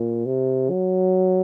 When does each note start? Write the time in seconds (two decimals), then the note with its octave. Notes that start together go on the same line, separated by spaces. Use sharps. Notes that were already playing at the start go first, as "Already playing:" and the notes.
Already playing: A#2
0.26 C3
0.70 F#3